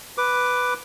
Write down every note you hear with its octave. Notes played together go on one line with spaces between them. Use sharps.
B4 D6